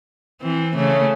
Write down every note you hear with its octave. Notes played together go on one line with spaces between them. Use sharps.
E3 C4
C#3 A3